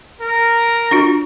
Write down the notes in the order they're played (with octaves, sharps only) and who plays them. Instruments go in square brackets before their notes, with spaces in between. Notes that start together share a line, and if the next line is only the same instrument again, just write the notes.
[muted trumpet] A#4
[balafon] D4 F4 F#4